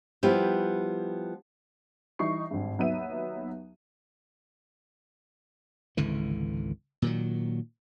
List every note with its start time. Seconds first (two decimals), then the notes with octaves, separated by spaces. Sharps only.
0.23 F3 G3 B3 E4 G4
2.19 E3 G3 D#4 D#5 C#6 C7
2.51 G#1 G2
2.78 D#2 F#3 B3 D#4 E5 D#7
5.97 G#1 C#2 D3 E3
7.02 A#2 D#3 F#3